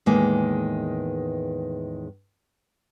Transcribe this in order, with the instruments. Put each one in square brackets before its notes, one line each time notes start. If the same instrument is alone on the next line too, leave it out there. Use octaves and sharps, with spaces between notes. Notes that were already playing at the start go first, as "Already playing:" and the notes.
[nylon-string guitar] E2 A2 D#3 G#3 A#3